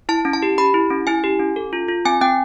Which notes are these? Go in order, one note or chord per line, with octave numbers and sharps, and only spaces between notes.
E4 A5
C#4
A5
G4
G4 B5
E4
C#4
E4 G#5
G4
C#4
A4
F4
F4
C4 G#5
C4 G5